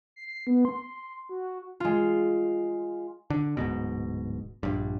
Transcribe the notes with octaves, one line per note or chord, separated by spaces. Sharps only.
C7
B3
C6
F#4
G#3 F4
D3
D1 G#2 B2
A#1 G2